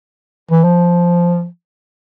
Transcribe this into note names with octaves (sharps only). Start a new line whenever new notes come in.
E3
F3